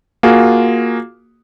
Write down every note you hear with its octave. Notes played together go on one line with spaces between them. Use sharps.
A#3 F4 F#4 G#4